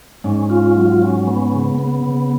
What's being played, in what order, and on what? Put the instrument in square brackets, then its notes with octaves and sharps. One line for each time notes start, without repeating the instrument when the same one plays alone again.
[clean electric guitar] G#2 [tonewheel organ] C#4
[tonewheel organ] F4
F#3
C#4
B3
C#3
B3
C#3